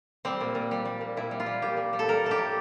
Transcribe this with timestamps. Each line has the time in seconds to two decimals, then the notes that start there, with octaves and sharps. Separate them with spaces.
0.25 G3 C4
0.41 A#2
0.55 A#2
0.71 G3
0.85 G3
1.01 A#2
1.17 A#2 E4
1.31 G3
1.40 F4
1.46 G3
1.62 A#2 G4
1.77 A#2
1.93 G3
1.99 A4
2.08 G3 A#4
2.24 A2 A4
2.31 G4
2.38 A2